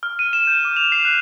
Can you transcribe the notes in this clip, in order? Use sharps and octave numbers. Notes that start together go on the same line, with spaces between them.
F6
D#7
E7
G6
D6
F7
C7
F#6